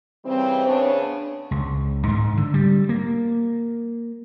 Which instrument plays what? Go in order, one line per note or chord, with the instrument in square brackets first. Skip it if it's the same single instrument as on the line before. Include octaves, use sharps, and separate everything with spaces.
[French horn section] C#3 E3 G3 C4
C#3 B3 D4 C#5
[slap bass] C#2
G#2
D3
G3
A#3